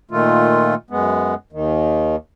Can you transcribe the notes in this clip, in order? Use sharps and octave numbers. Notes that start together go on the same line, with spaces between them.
A#2 D#3 A3 F4
F#2 G#3 B3
D#2 D#3